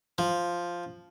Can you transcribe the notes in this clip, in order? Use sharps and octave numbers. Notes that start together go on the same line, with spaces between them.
F3